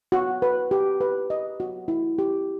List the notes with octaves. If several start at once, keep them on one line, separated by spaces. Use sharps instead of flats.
F#4
B4
G4
B4
D#5
F#4
E4
G4